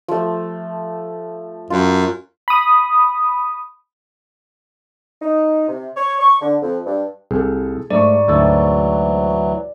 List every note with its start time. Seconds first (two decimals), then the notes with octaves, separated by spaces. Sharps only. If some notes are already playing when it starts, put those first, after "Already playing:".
0.08 F3 A3
1.70 F#2 F4
2.48 B5 D#6
5.21 D#4
5.68 C3
5.96 C#5
6.20 C#6
6.41 D3
6.62 F2
6.86 G2
7.31 C2 G#4 A4
7.90 G#2 A3 D5 C#6
8.28 D2 E3 F#3 E4 A4